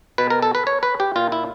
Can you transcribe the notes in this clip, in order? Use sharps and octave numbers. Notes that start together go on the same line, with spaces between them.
B2 B4
A#4
A4
B4
C#5
B4
G4
A#2 F4
E4